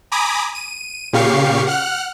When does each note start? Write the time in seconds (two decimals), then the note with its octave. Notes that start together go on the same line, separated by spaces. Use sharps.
0.12 G#5 A#5 B5 D6 D#6
0.55 D#7
1.13 A#2 C#3 G4 F5 C#6 C7
1.67 F#5 F6 F#6